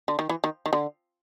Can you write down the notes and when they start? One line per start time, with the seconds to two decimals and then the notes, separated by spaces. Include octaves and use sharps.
0.08 D3
0.19 D#3
0.29 E3
0.44 D#3
0.66 D#3
0.73 D3